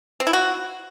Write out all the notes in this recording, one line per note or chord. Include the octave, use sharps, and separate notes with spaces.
C4
E4
F#4